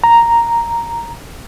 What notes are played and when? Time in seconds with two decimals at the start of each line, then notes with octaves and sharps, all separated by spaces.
0.04 A#5